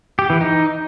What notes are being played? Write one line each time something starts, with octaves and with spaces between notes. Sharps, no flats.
G4
E3
D#4